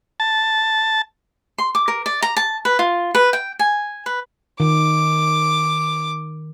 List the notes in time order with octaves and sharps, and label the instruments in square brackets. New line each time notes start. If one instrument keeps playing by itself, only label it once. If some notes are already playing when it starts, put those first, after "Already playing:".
[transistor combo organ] A5
[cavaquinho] C6
D6
A#4
D5
A#5
A5
B4
F4
B4
G5
G#5
B4
[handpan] D#3 [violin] D6